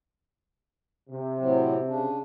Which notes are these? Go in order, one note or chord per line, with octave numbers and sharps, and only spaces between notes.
C3
A2 F#3 C4
C#3 D4